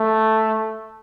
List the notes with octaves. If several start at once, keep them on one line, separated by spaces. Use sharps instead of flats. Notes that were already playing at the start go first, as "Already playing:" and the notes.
Already playing: A3